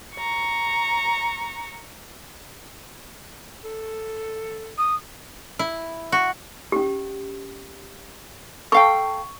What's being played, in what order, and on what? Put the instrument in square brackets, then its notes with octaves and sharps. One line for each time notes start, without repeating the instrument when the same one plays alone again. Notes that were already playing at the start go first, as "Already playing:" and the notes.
[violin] A#5 C#6
[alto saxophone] A4
[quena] D#6
[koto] E4
F#4
[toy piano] C#4 G4
[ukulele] A4 F5 G5 [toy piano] C#6